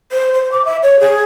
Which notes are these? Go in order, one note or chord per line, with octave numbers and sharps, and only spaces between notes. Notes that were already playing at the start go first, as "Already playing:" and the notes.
C5
C5
D6
E5
C#5
G#4